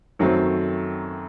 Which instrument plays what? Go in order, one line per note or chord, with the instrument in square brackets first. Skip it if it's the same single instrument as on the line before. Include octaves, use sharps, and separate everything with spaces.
[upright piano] F#2 D#3 F#3 A3 C4